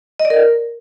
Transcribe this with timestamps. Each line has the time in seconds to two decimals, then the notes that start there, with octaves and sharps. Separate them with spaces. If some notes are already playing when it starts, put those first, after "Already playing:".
0.20 D#5
0.25 D5
0.30 A#4